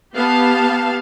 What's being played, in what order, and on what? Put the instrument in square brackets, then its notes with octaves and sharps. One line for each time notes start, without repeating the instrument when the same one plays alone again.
[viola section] B3 G4 F5 A5